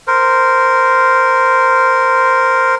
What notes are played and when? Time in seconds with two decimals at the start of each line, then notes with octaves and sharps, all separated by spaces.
0.07 A#4 C5